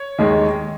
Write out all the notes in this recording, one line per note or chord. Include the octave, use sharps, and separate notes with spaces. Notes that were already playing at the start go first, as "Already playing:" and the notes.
Already playing: C#5
D#2 D#3 G#3